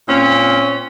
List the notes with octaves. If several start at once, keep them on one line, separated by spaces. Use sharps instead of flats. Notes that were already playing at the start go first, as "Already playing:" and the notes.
A#2 C4 C#4